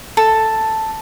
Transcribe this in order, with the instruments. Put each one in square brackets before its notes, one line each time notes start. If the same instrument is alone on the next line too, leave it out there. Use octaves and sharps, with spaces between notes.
[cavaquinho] A4